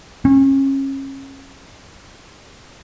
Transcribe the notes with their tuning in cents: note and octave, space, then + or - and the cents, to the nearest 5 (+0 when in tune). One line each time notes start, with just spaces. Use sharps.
C#4 -30